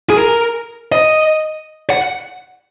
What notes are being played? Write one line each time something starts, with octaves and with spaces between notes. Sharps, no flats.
G#4
A#4
D#5
F#5